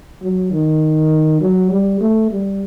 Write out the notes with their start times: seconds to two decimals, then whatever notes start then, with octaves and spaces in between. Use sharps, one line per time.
0.22 F#3
0.52 D#3
1.41 F#3
1.71 G3
2.01 A3
2.32 G3